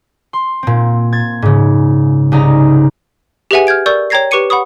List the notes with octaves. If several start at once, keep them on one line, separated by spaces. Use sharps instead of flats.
C6
A#2 C4
G#6 A6
G#2 C#3
C2 C#3 D#4 A#5
G4 G#4 B4 E5 F#5 G#5
F6 G6 G#6 D7
A#4 D5 C#6 E6 G6
C#5 G5 A#5 G#6 A#6 C7
G4 B4 C#6 D6 C#7 D#7
F#5 B5 C#6 D#6